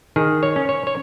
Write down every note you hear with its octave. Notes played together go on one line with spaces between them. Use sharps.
D#3 G#4
C#5
C#4
C#5
C#5